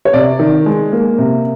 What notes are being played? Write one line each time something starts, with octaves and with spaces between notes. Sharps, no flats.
C#5
C3 D5
D#3
G#3
A#3
C3